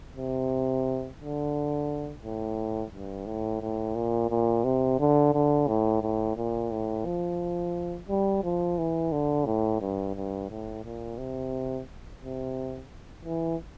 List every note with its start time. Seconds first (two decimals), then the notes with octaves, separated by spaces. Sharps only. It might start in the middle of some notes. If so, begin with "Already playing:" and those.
0.17 C3
1.21 D3
2.23 A2
2.93 G2
3.27 A2
3.61 A2
3.95 A#2
4.30 A#2
4.65 C3
5.00 D3
5.34 D3
5.68 A2
6.02 A2
6.37 A#2
6.71 A2
7.05 F3
8.09 G3
8.44 F3
8.78 E3
9.12 D3
9.46 A2
9.81 G2
10.15 G2
10.50 A2
10.85 A#2
11.18 C3
12.22 C3
13.25 E3